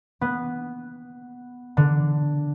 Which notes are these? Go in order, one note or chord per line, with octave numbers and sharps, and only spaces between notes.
B3
D3